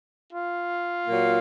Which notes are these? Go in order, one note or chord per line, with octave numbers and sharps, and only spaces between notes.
F4
A#2 F#3 A#3